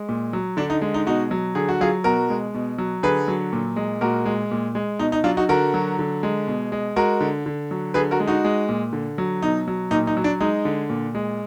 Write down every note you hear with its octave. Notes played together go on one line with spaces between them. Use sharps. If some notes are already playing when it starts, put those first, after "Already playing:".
Already playing: G#3
A#2
F#3
D3 D4
D#4
G#3
D#4
B2 D#4 F#4
F#3
D3 G#4
F#4
F#3 F4 G#4
B2 F#4 A#4
G#3
B2
F#3
D3 G#4 B4
F#3
A#2
G#3
A#2 F#4 A#4
G#3
A#2
G#3
B2 D#4
D#4
F#3 D4 F4
D#4 F#4
D3 F#4 A#4
F#3
D3
G#3
B2
G#3
G#3 F#4 A#4
D3
D3
F#3
D3 G#4 B4
F#4 A#4
G#3
D#4 F#4
G#3
A#2
D3
F#3
B2 D#4
F#3
A#2 D#4
D#4
F#3
D4
G#3 D#4
D3
A#2
G#3